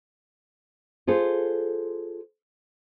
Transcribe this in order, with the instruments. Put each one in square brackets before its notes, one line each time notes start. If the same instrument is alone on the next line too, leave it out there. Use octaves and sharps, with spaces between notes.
[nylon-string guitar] F4 G#4 A4 C5